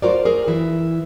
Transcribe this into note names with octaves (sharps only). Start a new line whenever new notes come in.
F4 F#4 A#4 C5 D5
G#4 A#4
E3 E4